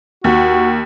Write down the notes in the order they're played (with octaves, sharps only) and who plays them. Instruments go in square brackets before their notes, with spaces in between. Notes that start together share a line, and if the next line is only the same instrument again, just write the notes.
[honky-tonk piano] D#2 [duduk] F#4